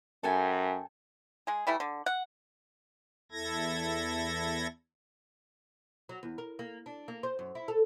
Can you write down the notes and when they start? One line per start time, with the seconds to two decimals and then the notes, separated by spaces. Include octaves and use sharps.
0.23 F#2 A4 G5 G#5
1.47 G#3 G#4
1.67 E3 G3 A3 E4
1.80 D3
2.06 F#5
3.32 E2 E4 A4 G#6 A#6
6.09 F#3
6.23 E2
6.38 A#4
6.59 A#3
6.86 D4
7.08 A#3
7.23 C5
7.39 F#2
7.55 E4
7.68 A4